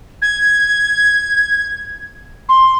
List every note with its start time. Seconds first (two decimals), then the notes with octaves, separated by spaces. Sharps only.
0.22 G#6
2.49 C6